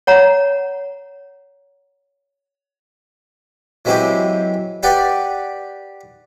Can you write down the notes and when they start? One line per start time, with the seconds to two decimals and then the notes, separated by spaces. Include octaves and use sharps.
0.07 C#5 F#5 A#5
3.85 E3 F#3 G#3 C4 E4 G4
4.83 G4 B4 D5 F#5 G5